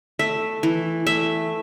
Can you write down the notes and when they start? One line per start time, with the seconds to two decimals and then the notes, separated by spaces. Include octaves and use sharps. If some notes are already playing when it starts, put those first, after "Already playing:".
0.19 A3 E5
0.63 E3
1.07 A3 E5